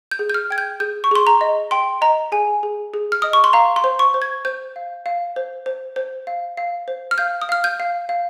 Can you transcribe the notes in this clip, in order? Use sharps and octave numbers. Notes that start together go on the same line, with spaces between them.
G6
G#4
G6
F6
G5 G#6
G6
G#4 G6
C#6
G#4 C6
A#5
D#5
G5 C6
D#5 A#5
G#4 G#5
G#4
G#4
F6
D#5 D#6
C#6
C6
F5 A#5
C6
C5
C#6
C5
G#6
C5 G6
F5
F5
C5
C5
C5
F5
F5
C5
F6
F5 G6
D#6
F5 F6
G6
F5
F5